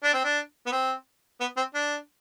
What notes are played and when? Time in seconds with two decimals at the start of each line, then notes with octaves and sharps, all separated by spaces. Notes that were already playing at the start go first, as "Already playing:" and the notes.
0.04 D4
0.14 C4
0.24 D4
0.66 B3
0.72 C4
1.41 B3
1.57 C4
1.74 D4